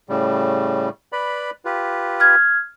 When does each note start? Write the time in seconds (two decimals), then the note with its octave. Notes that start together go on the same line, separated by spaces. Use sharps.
0.09 A2 C#3 G3
1.12 B4 D5 B5
1.65 F4 G4 B4
2.20 F6 G#6